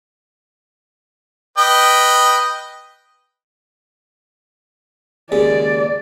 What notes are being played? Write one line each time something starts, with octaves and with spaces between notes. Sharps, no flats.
B4 D#5 G5
D#2 C#3 G#3 D5